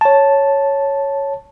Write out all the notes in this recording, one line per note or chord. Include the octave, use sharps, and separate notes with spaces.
C#5 A5